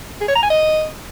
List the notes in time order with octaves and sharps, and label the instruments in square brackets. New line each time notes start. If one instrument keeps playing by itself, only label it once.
[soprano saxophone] G#4
C#5
A#5
G#5
D#5